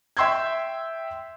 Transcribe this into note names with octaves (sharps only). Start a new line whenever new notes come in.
E5 G5 C6 E6 G6 G#6